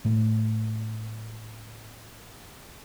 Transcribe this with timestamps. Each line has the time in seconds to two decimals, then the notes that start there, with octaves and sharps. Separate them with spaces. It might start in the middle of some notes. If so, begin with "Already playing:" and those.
0.05 A2 A3